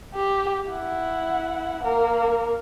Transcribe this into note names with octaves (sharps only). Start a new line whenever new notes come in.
G4
E4 F#5
A#3 A#4